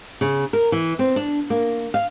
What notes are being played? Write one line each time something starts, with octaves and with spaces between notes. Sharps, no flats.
C#3
A#4
E3
C4
D4
A#3
F5